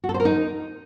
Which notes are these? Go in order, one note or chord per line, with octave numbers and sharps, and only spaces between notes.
F#4
A4
C5
A#4
D#4